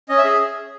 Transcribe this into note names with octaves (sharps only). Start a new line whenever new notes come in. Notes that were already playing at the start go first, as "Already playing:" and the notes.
C#4 D#5
E5
G#4